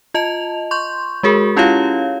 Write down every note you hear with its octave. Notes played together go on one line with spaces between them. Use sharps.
F4 D#5 A5 F7
C6 C#6 G6
G#3 F#4 G#4 A#4
C#4 E4 F4 G4 C#5 F5